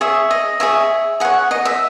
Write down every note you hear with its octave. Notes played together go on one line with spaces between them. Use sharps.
G#4 C#5 E5
D#5
G#4 C#5 E5
G#4 C#5 F#5
D#5
E5